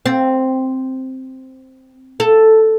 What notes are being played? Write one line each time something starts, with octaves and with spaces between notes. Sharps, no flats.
C4
A4